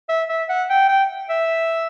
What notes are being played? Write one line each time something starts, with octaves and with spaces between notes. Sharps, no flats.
E5
E5
F#5
G5
G5
E5